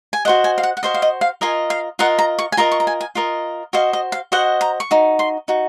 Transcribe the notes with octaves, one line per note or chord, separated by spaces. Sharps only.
G#5
F#4 C5 D#5 F#5
G#5
F5
F#5
F#5
F#4 C5 D#5 F5
F5
D#5
F5
F4 A#4 D#5 G#5
F5
F4 A#4 D#5 F#5
A#5
C#6
G#5
F4 A#4 D#5 A#5
C#6
A#5
G#5
G#5
F4 A#4 D#5
F#4 C5 D#5 F5
D#5
F5
F#4 C5 D#5 F#5
A#5
C#6
D#4 F#4
C6
D#4 F#4